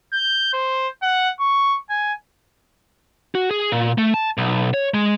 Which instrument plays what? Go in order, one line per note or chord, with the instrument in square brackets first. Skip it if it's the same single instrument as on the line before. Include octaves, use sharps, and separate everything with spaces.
[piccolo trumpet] G6
C5
F#5
C#6
G#5
[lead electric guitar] F#4
G#4
A#2
A3
A5
B1
C#5
G#3